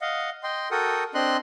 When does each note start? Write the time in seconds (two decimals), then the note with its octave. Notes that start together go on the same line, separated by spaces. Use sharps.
0.01 D#5 F5 F#5
0.43 D#5 G5 C6
0.71 F#4 A4 A#4 F#5 G5 D#6
1.15 C4 D4 D#5 C6 F#6